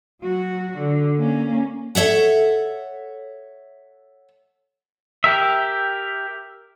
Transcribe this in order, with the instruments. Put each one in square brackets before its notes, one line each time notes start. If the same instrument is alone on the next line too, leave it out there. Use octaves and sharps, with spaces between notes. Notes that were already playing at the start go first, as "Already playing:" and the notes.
[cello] F#3 F#4
D3
A#3 C#4
[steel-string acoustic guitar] A4 C#5 E5 F#5
[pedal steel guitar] G4 A#4 E5